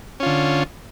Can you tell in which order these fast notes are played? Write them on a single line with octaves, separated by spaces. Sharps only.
C#4 F4 D3